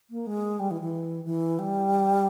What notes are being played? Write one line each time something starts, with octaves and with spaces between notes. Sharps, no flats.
A#3
G#3
G3
E3
E3
E3
G3